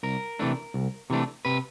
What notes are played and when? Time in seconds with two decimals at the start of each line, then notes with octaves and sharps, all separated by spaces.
0.03 C2 A#4
0.39 C3 E3 A3 D4
0.74 C2
1.10 C3 E3 A3 D4
1.45 C3 B4